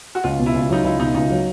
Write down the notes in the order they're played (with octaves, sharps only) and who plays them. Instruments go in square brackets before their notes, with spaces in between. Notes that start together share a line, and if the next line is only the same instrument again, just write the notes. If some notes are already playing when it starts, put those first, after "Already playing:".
[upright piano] F#4
[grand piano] C#2 [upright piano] F4
[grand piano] B2
[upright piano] E4
[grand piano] C#2
[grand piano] F#3 [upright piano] D#4
[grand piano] C#2 [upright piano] E4
[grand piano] B2 [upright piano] D#4
[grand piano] C#2 [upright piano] D#4
[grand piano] F#3